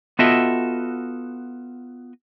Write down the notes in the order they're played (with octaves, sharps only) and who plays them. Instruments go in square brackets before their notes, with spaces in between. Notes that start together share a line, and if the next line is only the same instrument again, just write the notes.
[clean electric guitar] B3 F4 F#4 A4 D#5 E5